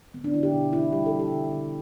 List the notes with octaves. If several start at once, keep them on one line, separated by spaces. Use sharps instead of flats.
D3 B3
D4
D3 E4
G4
B2
A3 E4
G3 G4
A4
G3
G4
D3
D3